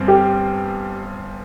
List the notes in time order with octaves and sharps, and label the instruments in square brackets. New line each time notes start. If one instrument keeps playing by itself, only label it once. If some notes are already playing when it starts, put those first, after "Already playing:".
Already playing: [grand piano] G1 G2 G3 C4
[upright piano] G4